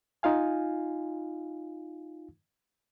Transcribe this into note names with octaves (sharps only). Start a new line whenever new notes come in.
D#4 F4 F5 G#5